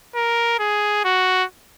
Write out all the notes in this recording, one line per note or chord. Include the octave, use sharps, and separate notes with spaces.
A#4
G#4
F#4